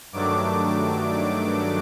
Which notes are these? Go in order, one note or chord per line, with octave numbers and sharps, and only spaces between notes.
G2 D#3 F#3 A3 D4 D6